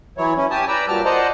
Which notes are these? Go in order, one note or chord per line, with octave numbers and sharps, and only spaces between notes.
E3 F#3 E4 C#5
C#4 E4
G4 G#5 A5 D#6
B4 D5 G5 A#5 E6
A#2 F#3 G3 A5 F6
C5 D5 D#5 F#5 A5 A#5